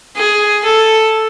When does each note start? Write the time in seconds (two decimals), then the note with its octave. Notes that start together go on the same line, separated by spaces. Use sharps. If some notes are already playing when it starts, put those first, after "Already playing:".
0.16 G#4
0.64 A4